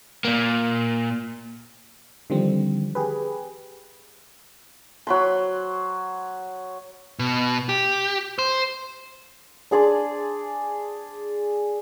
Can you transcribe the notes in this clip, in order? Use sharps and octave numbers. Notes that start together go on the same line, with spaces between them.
A#2 A#3
D3 D#3 F3 G3 C4
G4 G#4 B4
F#3 B5 C6
B2
G4
C5
D4 G#4 D5 C6